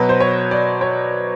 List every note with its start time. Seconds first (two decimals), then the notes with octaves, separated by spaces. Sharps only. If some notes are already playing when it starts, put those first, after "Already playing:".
Already playing: B2 F#3 B4
0.09 C5
0.20 C#5
0.51 D5
0.81 C#5